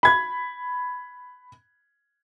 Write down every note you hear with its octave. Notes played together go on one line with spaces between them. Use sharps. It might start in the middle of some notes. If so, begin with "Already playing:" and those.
B5 G#6